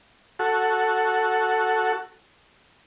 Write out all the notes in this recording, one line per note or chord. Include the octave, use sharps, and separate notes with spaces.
F#4 A4